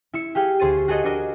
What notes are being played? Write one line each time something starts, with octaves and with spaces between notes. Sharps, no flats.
E4 E6 C#7
G4 G#4 F5 G5
D2 G#4 C5 A6 D#7
F#4 G#4 A4 D#5 F#5
D4 F#4 A#4 D#5